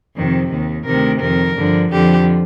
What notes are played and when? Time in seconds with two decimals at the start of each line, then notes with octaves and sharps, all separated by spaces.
0.15 F2 C3 D#3
0.50 D#2 D#3
0.86 D2 C3 D#3 A#4
1.21 F2 D#3 A#4
1.56 G2 D3 F3
1.92 F2 D3 F3 G4